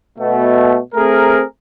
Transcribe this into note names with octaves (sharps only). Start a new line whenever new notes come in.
B2 A3
A3 C4 G#4 A#4